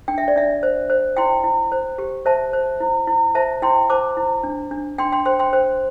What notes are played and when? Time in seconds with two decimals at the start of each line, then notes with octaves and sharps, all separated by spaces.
0.08 D4 G5
0.18 E5
0.28 D5
0.36 D4 E5
0.63 C5
0.90 C5
1.17 E4 G5 C6
1.44 E4
1.72 C5
1.98 G4
2.26 C5 E5 A5
2.53 C5
2.80 E4
3.07 E4
3.35 C5 E5 A5
3.62 E4 G5 C6
3.90 C5 A5 D6
4.17 E4
4.44 D4
4.71 D4
4.98 D4 G5 C6
5.12 G5 C6
5.25 C5 G5 C6
5.39 G5 C6
5.53 C5